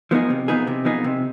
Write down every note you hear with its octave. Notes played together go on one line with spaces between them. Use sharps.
F3 B3 D#4 G#4
C3
F3 B3 D#4 G#4
C3
F3 B3 D#4 G#4
C3